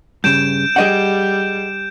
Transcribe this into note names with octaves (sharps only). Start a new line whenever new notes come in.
G2 C#3 G6 D7 E7
G3 G#4 D#5 F#5